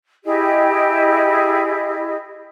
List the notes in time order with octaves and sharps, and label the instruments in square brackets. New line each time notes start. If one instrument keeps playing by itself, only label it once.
[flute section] E4 G4 G#4 D#5